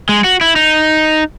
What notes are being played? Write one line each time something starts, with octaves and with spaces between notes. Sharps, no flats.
G#3
F#4
E4
D#4